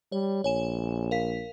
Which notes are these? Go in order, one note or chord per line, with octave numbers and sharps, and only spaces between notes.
G3 C#5
A#1 C#5 G#5 E7
A#4 F5 B6